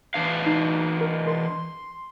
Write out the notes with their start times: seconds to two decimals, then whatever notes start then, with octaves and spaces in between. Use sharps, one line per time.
0.14 E3 D4 F5
0.46 D#4
1.01 A#4
1.28 C6